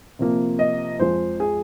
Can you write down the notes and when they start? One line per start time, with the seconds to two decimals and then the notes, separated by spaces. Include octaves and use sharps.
0.19 C3 F3 A#3
0.59 D#5
1.00 F2 F3 G#3 C5
1.40 G#4